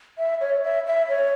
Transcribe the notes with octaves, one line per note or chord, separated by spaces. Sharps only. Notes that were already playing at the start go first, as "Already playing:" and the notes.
E5
C#5
E5
E5
C#5